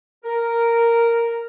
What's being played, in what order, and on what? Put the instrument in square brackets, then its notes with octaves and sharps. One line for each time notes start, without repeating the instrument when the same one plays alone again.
[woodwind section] A#4